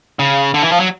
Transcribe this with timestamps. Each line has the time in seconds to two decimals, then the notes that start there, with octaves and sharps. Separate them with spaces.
0.19 C#3
0.54 D3
0.62 E3
0.72 F3
0.80 F#3